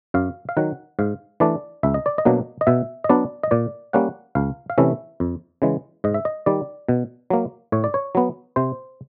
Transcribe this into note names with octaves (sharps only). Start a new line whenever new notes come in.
F#2 F5
F5
D#3 F#3 F#5
G#2 F5
E3 A3 D4 D5
C#2 E5
D#5
D5
D#5
B2 F#3 A#3 D4
D#5
B2 E5
D#5
F#3 B3 D4 D5
D#5
A#2 D5
G3 A#3 C#4 F#5
C#2 F5
F5
C3 E3 A3 C#4 E5
F2
C#3 E3 G#3
G#2 D#5
E5
D#5
D#3 G3 D5
B2
F#3 A#3
A2 C#5
D5
C#5
F#3 B3
C3 C5